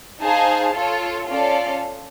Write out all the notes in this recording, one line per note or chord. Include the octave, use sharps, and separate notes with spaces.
D#4 G#4 C5 F5 A5
F4 A4 C#5
C#4 F4 A4 D5 F5